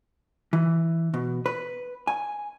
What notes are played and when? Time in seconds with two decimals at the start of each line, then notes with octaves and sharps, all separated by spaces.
0.53 E3
1.14 B2
1.46 B4
2.07 G#5